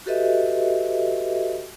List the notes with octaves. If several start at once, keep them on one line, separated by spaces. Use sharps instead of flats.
F#4 G4 A4 B4 D#5 E5